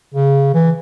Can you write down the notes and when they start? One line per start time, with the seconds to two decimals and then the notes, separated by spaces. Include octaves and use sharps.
0.14 C#3
0.54 E3